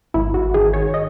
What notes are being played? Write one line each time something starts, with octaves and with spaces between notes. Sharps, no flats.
G#1 E4
F#4
D#3 G#4
C#5
D#5